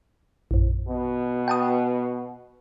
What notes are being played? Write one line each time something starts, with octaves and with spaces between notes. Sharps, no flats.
A#1 F#2
B2
G5 A5 D#6